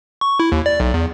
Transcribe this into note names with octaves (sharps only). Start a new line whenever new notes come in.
C#6
E4
D#2
D5
B1
E2